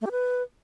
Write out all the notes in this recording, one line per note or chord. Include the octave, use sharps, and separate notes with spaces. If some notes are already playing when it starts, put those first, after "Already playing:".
A3
G4
B4